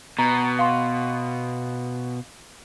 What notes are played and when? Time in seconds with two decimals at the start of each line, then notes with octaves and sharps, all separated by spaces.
0.19 B2 A#5
0.59 F5 C6